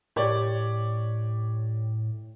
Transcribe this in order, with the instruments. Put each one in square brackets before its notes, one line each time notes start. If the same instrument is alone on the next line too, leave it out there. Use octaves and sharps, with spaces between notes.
[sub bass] A2 [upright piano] G4 C#5 D5